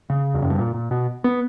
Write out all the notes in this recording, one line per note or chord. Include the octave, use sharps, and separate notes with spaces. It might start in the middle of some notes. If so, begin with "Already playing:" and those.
C#3
E2
F#2
G2
A#2
A#2
B2
B3